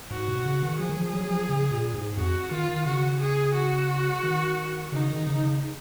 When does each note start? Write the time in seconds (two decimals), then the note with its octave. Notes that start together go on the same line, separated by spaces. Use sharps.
0.10 G#2 F#4
0.28 B2
0.46 C#3
0.63 D#3
0.79 F3 G#4
0.89 D#3
0.97 F3
1.13 F#3
1.31 F3
1.49 C#3
1.71 A#2
1.94 G#2
2.17 F2 F#4
2.51 D#3 F4
2.69 D#3
2.85 C#3 F#4
3.20 G#4
3.55 F#4
4.23 D#3
4.92 C#3 D#4
5.10 D#3
5.27 C#3
5.43 C#3